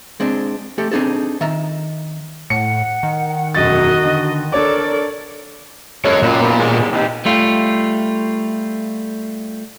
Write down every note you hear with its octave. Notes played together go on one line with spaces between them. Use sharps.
G#3 C4 D4
A3 G4 A4
C4 D4 D#4 G#4 A4
D#3 E5 A#5
A2 F#5 C#7
D#3
E1 F#2 F#4 D#5 A6
D3
D4 A4 A#4 C#5 D5 D6
F#2 G#3 A4 C#5
C#2 A#2
F3 B3
D#2 B2 G#3
E2 C3 D#4
G3 A3 F4